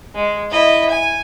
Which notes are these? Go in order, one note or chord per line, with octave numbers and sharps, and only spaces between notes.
G#3
E4 D#5
G#5